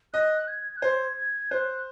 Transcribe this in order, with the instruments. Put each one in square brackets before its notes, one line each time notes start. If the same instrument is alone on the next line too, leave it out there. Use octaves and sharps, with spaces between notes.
[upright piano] D#5 [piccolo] F#6
[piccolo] G#6
F#6
[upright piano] C5 [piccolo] G#6
[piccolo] G#6
[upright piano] C5 [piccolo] F#6